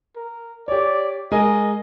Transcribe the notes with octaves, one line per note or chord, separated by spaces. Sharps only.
A#4
G4 C#5 D5
G#3 A#4 D#5 G#5